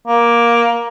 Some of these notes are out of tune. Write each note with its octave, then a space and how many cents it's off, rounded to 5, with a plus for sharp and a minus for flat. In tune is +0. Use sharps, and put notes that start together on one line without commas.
A#3 +10